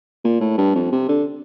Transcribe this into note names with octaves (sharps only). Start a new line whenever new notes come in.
A#2
A2
G2
F2
C3
D3